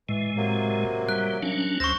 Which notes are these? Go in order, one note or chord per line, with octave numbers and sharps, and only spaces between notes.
A2 E3 G#3
C3 F#3 A#3
G3 F#6
F#3 C#4 D4
D2 C5 C#6 E6 A#6